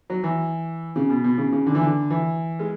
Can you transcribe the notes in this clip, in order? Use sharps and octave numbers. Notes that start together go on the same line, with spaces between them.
F#3
E3
C#3
B2
B2
C#3
C#3
D3
E3
D3
E3
G#3